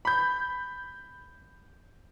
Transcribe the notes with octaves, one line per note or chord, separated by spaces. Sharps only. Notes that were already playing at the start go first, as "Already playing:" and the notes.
B5 G6